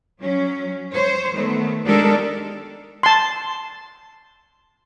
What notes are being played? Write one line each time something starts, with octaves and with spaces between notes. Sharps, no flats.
F#3 C#4
C5 C#5
D#3 A3 B3
G#3 D4 D#4 G4 A4 A#4
A5 C6